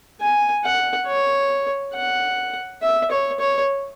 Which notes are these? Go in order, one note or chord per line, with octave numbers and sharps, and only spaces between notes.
G#5
F#5
C#5
F#5
E5
C#5
C#5